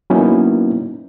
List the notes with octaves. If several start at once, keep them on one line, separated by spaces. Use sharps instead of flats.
F#3 A#3 B3 C#4 D#4 E4